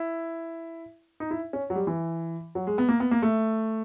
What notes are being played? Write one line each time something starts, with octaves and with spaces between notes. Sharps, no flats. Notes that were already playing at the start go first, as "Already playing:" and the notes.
Already playing: E4
D#4
E4
C#4
F#3
G3
E3
F#3
G#3
B3
A#3
B3
A#3
A3